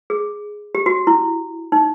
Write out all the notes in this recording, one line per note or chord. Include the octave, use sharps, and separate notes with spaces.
G#4
G4
F#4
E4
D#4